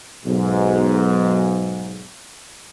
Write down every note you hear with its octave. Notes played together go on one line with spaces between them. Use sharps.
B1 G#2